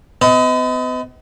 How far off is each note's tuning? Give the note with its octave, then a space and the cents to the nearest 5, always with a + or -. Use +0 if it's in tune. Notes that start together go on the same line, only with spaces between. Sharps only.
B3 +40 D#5 +30